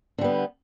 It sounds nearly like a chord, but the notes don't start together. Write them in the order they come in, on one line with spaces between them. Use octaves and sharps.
D3 G3 B3